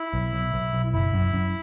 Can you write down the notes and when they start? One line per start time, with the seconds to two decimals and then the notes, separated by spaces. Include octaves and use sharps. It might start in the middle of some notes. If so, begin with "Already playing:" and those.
Already playing: E4
0.13 B1
0.33 B1
0.54 B1
0.73 B1
0.93 F#1 E4
1.14 F#2
1.34 F#2